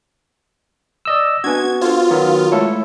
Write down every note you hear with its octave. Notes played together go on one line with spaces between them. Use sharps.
D5 D#5 E6
B3 C4 D4 F#4 G#5 G#6
F4 A4 C5
D#3 F#3 B3
G#3 A3 E4 A4 C#5